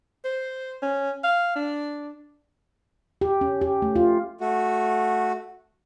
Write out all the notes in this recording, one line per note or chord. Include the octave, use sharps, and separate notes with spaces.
C5
C#4
F5
D4
G4
C#4
G4
A3
F4
A3 F#4